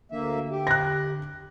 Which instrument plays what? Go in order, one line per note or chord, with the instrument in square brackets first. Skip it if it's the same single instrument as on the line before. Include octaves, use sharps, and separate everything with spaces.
[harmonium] D2 A#3 E5 [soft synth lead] D3
[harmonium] G4
[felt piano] F#6 A#6